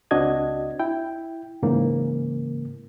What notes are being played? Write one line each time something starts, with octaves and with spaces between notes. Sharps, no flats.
C#2 C4 D4 F#4 D#5 G#6
E4 G5
G#2 C#3 E3 A#3